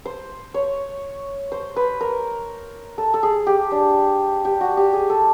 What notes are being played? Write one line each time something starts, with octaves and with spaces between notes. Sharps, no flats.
C5
C#5
C5
B4
A#4
A4
A4
G#4
G4
D4
G4
F#4
G4
G#4
A4